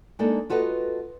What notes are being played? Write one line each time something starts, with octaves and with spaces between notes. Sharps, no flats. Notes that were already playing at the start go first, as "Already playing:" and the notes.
G#3 A#3 D4 D#4 A4
F4 F#4 A4 B4 D#5